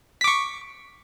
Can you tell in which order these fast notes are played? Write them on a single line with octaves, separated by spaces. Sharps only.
B6 D6 C#6